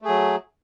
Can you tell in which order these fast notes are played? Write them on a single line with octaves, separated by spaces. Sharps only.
A3 G#4 F#3